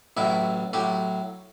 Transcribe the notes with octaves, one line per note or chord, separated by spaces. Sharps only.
A1 A2 F#3 E4
A2 F#3 G4